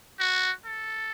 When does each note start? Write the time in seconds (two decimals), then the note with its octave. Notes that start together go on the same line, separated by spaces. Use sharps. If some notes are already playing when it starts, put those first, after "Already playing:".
0.19 F#4
0.65 A4